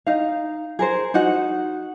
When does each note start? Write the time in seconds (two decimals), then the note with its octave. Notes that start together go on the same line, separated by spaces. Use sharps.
0.06 D#4 F5
0.79 G#4 A#4 C5
1.14 D#4 F#4 F#5